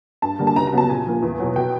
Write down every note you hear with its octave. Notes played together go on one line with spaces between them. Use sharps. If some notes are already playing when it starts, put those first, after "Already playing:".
G2 A5
D3 G3 A#3
A5
C#2 A#5
A#5
C#3 F#3 B3 A5
A#2 G#5
F3 A#3
E2
B2 F#3
B2 G5